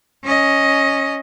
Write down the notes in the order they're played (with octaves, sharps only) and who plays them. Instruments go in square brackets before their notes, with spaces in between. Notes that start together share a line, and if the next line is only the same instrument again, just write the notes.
[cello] C#4 D#5